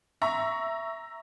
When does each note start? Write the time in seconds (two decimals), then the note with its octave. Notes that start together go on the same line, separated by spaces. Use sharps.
0.22 E5 A#5 C#6